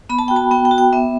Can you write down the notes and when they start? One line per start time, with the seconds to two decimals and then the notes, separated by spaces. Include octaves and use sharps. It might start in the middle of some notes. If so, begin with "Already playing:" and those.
0.09 B3 B5
0.19 A5
0.28 F#4 G5
0.36 A5
0.51 B3 G5
0.65 G5
0.71 F#4
0.78 G5
0.93 B3 E5